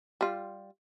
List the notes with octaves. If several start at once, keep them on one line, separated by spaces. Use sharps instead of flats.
G3 F4